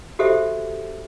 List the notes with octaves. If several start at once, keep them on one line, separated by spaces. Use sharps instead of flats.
F#4 G4 A4 C5 E5